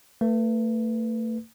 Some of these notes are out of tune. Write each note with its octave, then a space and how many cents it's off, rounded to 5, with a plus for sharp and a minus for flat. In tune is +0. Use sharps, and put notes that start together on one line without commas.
A3 +35 B4 +0